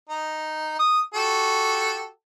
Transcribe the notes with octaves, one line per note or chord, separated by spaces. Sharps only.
D#4
D#6
F#4 G4 A4